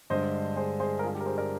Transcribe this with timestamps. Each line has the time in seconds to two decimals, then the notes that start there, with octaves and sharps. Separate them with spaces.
0.10 G2 D3 G#3 C5 D#5
0.56 G#4 C5
0.80 G#4 C5
0.99 A#4
1.03 F4 G#4
1.15 G4
1.21 A#4
1.26 G#4 C5
1.38 A#4 D5